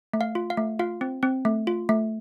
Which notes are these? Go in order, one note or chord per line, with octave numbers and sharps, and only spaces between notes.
A3
F5
F4
F5
A3
F4 F5
C4
C4
A3
F4
A3